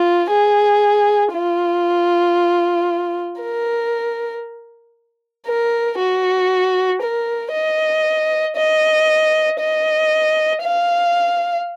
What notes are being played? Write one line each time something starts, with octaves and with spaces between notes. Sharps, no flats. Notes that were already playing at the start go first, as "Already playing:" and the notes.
Already playing: F4
G#4
F4
A#4
A#4
F#4
A#4
D#5
D#5
D#5
F5